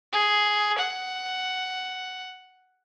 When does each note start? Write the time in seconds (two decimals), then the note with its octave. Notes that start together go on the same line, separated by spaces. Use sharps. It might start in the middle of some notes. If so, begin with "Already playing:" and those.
0.13 G#4
0.78 F#5